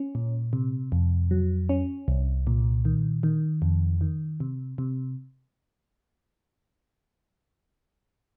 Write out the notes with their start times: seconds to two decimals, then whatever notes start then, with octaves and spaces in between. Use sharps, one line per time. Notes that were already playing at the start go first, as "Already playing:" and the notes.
Already playing: C#4
0.15 A#2
0.53 C3
0.92 F2
1.31 F#3
1.69 C#4
2.08 C2
2.47 A#2
2.85 D#3
3.23 D#3
3.62 F2
4.01 D#3
4.40 C3
4.78 C3